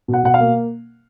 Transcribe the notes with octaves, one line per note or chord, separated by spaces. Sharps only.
B2
F#5
B2 F#5
F5
A#3